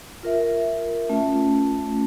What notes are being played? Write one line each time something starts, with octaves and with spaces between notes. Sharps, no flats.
F4 A#4 E5
A3 C#4 F4